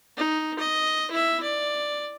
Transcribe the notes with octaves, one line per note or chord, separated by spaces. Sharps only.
D#4
D#5
E4 E5
D5